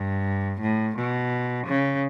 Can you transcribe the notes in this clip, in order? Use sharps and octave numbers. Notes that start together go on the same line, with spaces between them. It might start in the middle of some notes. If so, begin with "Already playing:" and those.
Already playing: G2
A2
B2
C#3